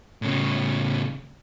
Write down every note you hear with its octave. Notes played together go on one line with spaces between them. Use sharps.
A2 C#3